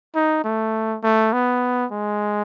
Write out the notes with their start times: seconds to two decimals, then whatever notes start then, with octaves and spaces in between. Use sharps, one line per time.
0.15 D#4
0.44 A3
1.03 A3
1.33 B3
1.92 G#3